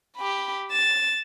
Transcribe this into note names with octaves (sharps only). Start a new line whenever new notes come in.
G4 B5
A6 E7